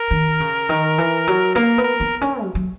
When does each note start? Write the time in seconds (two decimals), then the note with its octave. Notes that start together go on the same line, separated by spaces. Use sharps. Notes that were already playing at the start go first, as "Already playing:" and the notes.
Already playing: A#4
0.11 D#3
0.40 C#3
0.69 D#3
0.98 E3
1.27 F#3
1.56 A#3 A#4
1.78 B3
1.85 A#4
2.00 B3
2.21 C#4
2.43 F#3
2.55 F#3